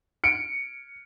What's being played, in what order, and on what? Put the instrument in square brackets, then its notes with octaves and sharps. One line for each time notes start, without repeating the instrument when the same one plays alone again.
[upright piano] C#7 D7